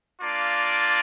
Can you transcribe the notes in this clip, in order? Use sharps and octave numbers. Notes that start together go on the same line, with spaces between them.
A#3 D4 F4 D5